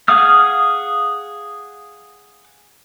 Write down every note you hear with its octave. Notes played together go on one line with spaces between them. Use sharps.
G#4 F5 F#5 D#6 F6